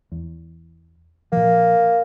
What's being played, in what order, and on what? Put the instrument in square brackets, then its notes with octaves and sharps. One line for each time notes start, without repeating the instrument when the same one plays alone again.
[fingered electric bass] E2
[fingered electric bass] A#2 F3 [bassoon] A#3